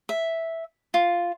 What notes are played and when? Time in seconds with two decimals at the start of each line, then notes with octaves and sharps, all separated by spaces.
0.09 E5
0.94 F4